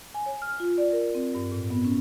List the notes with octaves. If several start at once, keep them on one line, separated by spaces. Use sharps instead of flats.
G#5
C#5
F6
F4
D5
A#4
C4
G2
A2
B3
C#4